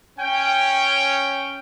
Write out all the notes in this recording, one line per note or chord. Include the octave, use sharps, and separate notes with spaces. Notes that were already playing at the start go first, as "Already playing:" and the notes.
C#4 G5